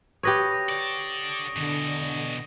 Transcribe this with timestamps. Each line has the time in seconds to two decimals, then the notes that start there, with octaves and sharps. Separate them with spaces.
0.23 G4 B4 C#5 C#6 D#6 A#6
0.69 D3 D5
1.56 B2 D3 E3